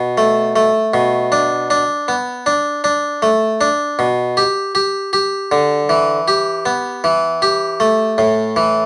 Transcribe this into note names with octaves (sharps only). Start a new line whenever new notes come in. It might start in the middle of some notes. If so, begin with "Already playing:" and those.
Already playing: B2
A3
A3
B2
D4
D4
B3
D4
D4
A3
D4
B2
G4
G4
G4
D3
E3
G4
B3
E3
G4
A3
A2
E3